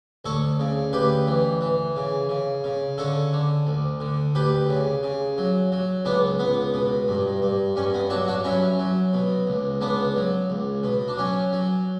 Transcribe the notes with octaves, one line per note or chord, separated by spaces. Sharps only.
D2 A4 C#5
C#3
D2 G4 B4
E3
E3
C#3
C#3
C#3
D3 A4 C#5
D3
D2
D3
D2 G4 B4
C#3
C#3
F#3
F#3
C#2 B3 D4
C#2 B3
B2
G2
G2
G2 C#4
B3
F#3 D4 F#4
D4 F#4
F#3 C#4 E4
F#3
B2
C#2
C#2 B3 D4
F#3
C#2
B2
D4
F#3 C#4
F#3